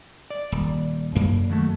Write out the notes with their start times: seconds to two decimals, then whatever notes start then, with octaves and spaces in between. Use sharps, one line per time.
0.30 D5
0.52 D#1
1.15 F#2 A#3
1.50 D#2 F#3 A3